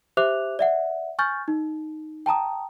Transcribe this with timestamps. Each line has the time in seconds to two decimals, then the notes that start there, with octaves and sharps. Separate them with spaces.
0.17 G4 C5 E5 D6 F#6 F7
0.59 D5 E5 F#5
1.19 G#5 C#6 F6 G6 A6
1.48 D#4
2.26 G5 A5 A#5 D#6